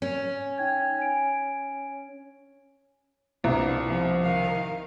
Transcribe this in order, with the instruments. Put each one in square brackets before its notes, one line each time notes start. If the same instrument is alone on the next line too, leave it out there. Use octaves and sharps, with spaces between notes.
[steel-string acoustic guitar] C#4
[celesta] D#4 G5 G#6
G#5 D7
[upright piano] C2 [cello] B2 D4
[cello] C3 F3
D#3 F5